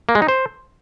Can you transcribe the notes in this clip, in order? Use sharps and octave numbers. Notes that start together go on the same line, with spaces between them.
A#3
G#3
D#4
C5